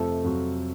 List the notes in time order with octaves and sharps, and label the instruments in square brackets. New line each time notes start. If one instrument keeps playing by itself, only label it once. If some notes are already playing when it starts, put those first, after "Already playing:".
Already playing: [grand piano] F2 C3 F3 A3 [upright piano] A4
[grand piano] F2 C3 F#3